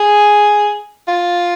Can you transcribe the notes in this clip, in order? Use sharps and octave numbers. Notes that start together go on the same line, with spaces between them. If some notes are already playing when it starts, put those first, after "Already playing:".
Already playing: G#4
F4